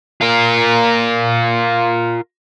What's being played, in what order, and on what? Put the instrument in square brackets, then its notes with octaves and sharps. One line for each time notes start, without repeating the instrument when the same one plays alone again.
[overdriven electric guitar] F4 A#4